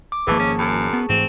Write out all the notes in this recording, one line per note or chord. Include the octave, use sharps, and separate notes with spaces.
D6
G#1 E3 F3 A#3 G#4 A5 C#6
C#4
F#2
B3
G#2 E3 A3 C4